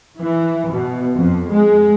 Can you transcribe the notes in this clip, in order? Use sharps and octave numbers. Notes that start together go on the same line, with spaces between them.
E3
B2
F2
G#3